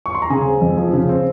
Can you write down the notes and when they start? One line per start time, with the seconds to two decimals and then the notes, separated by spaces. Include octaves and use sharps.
0.06 C#6
0.15 C6
0.22 A#5
0.30 C#3 G#4 G#5
0.46 C4
0.61 F2
0.77 F3
0.93 C#3
1.09 C4